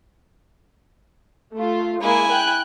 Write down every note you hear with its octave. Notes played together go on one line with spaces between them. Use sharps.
A3 F4
G#3 A#3 E4 G#5
G5 F#6